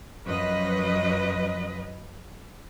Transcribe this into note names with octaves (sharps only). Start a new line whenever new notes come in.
F#2 F3 B4 D#5